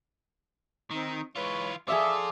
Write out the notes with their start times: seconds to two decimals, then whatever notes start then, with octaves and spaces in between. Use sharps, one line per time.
0.91 D#3 C4 D#4
1.36 E3 G#3 F4 B4 C#5
1.88 F3 F4 G#4 A4 D5 E5